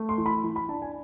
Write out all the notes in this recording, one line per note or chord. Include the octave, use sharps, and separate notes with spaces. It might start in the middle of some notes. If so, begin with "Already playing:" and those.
Already playing: A3
C6
E3
B5
E3
B5
D4 A5
G#5